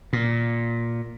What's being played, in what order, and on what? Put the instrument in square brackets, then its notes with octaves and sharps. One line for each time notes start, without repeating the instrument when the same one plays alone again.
[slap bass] A#2